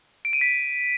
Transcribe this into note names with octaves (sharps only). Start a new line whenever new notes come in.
D7
D#7
B6